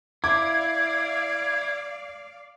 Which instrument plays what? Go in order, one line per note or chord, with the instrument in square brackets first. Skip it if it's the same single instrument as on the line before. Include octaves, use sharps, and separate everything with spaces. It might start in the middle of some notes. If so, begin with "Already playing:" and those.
[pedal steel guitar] E4 [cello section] D5 F5 [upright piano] D6 [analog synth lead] G#6